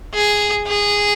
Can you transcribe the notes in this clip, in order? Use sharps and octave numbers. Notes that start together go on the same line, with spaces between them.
G#4
G#4